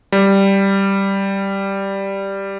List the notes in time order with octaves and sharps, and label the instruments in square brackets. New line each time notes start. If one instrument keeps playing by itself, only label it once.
[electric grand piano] G3